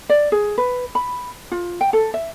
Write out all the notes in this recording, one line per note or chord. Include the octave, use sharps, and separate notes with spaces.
D5
G#4
B4
B5
F4
G5
A4
E5